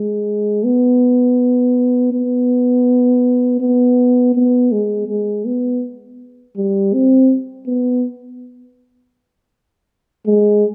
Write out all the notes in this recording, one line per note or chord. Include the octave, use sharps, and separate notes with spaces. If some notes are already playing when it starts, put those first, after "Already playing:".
Already playing: G#3
B3
B3
B3
B3
G#3
G#3
B3
G3
C4
B3
G#3